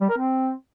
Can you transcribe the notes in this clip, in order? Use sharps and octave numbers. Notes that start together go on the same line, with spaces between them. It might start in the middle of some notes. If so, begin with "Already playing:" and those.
G3
A#4
C4